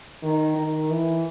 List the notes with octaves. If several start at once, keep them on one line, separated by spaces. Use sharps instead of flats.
D#3
D#3
E3